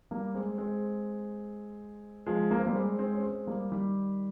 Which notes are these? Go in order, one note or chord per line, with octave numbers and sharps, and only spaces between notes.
G3 A#3
G#3 C4
G#3 C4
F3 G#3
A#3
C4
G3 A#3
G#3 C4
G#3 C4
C#4
G#3 C4
G3 A#3
D#3 G3